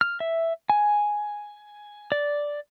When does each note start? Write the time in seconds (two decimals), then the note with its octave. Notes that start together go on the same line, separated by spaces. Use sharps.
0.01 F6
0.20 E5
0.70 G#5
2.12 D5